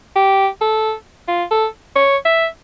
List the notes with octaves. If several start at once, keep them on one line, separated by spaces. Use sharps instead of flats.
G4
A4
F4
A4
C#5
E5